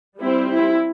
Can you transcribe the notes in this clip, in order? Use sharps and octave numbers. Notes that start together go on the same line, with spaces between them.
G3 C4 E4
E4